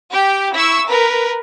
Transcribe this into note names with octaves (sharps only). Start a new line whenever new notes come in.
G4
E4 C#6 E6
A#4 B4